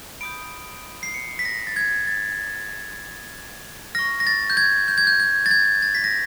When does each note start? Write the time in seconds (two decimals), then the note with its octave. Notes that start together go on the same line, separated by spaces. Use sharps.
0.21 B5 D#6 G6 D7
1.03 C7
1.14 C#7
1.39 B6
1.45 A#6
1.67 A6
1.76 G#6
2.07 A6
3.95 C#6 F6 A#6
4.20 A#6
4.27 A6
4.50 G6
4.57 G#6
4.88 G6
4.98 G#6
5.07 G6
5.20 G#6
5.46 A6
5.51 G#6
5.82 A6
5.95 B6
6.04 A#6